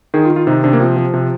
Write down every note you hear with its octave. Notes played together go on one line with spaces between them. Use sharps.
D#3 G#4
F4
D#3
F4
C3 D#4
C3 D4
A#3
F3 C4
F3
C3